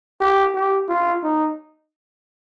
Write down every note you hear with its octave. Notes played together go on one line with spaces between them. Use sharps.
G4
G4
F4
D#4